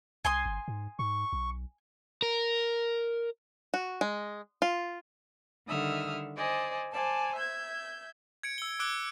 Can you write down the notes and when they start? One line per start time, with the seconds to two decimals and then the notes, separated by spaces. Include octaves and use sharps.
0.25 C2 G#5 C6 D#6
0.46 G1
0.68 G#2
0.99 G#2 C#6
1.33 B1
2.22 A#4
3.74 F#4
4.01 G#3
4.62 F4
5.67 D3 D#3 G3 E5 D#6 F6
6.37 C5 D5 D#5 G#5
6.92 C5 D5 G#5 A5
7.35 E5 G6 G#6
8.43 G#6 C#7 D7
8.58 E6 G7
8.79 D6 E6 F#6 D7 G7